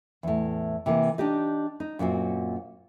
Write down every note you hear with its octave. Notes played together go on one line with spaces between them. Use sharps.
E2 A2
C3 E3 A#3
D4 D#4 G4 D#5
D#4
F#2 A#2 C4 F#4